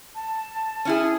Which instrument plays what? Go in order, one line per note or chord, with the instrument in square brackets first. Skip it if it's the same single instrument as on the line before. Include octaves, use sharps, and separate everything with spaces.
[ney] A5
[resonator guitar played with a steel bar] C#4 E4 G#4